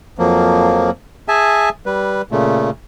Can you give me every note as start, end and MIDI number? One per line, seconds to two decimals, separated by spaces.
0.18 0.90 41
0.18 0.90 53
0.18 0.90 54
0.18 0.90 58
1.28 1.69 68
1.28 1.69 76
1.28 1.69 80
1.28 1.69 81
1.86 2.22 55
1.86 2.22 71
2.31 2.70 46
2.31 2.70 49
2.31 2.70 57